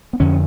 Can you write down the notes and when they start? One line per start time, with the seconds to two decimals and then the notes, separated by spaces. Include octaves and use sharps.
0.13 B3
0.20 F2 D3 C#4